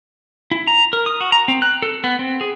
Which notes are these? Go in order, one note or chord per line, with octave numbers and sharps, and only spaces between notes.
E4
A#5
A#4
D#6
F#4
A#5
C4
F#6
A4
B3
C4
G#4